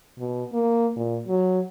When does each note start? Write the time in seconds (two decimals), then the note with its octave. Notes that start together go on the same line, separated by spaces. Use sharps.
0.19 B2
0.53 A#3
0.96 A#2
1.28 F#3